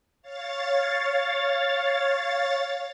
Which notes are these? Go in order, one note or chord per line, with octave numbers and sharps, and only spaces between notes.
C#5 F5 A6